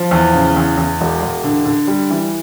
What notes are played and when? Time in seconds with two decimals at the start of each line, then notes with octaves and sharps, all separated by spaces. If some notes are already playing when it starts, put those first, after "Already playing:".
Already playing: F3
0.11 E2
0.33 C#3
0.57 E2
0.77 E2
1.01 E1
1.22 E1
1.44 D3
1.65 D3
1.88 G3
2.10 E3